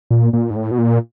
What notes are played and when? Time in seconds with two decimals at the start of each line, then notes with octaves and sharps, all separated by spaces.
0.10 A#2
0.33 A#2
0.50 G#2
0.56 A2
0.71 B2
0.78 A#2